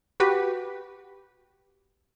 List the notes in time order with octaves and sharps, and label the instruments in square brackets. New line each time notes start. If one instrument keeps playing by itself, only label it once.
[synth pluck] F#4 G4 B4